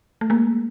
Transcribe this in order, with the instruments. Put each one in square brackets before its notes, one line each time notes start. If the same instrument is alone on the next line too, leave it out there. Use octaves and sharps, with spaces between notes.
[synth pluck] A3
G#3 A#3